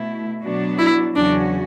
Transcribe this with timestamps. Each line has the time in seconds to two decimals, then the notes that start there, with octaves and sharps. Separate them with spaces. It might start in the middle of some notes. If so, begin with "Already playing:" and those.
Already playing: B2 A3 E4
0.42 B2 F#3 B3 D4 F#4
0.79 E4
1.15 E2 C#3 F#3 C#4 D4 F#4